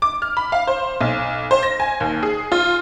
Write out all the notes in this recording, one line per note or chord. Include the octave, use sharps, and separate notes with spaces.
D6
F6
B5
F5
C5
B1
C5
A#6
G#5
D#2
G#4
F4